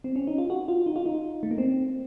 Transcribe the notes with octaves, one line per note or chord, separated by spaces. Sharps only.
C4
C#4
D#4
F4
F#4
F4
D#4
F4
D#4
A3
A#3
C4